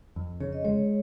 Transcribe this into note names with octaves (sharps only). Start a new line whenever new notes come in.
F2
C#3 C#5
D#5
G#3 C#5